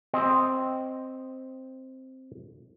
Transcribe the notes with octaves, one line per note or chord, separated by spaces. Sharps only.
C4 D#5